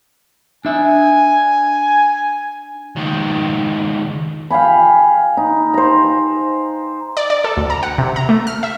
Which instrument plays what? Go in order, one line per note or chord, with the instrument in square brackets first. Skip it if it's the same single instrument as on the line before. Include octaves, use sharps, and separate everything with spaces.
[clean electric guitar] D4 E5 [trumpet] G#5
[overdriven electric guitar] C#2 D#3
[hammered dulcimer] F5 G5 G#5 B5
D#4
C5 A#5
[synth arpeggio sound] D5
D5
A4
D2
A#5
F#5
C3
A#5
A3
F6
E5